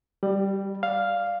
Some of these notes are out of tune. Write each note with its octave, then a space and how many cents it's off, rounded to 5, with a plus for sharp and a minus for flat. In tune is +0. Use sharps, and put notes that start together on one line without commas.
G3 +0 G4 -35 D5 +30
D5 +0 F5 +0